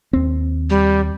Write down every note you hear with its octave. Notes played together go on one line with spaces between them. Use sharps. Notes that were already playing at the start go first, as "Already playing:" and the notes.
D#2 C4
G3